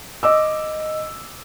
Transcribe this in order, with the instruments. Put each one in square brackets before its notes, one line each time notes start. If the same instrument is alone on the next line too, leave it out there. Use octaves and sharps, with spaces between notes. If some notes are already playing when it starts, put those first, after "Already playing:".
[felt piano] D#5 D6 E6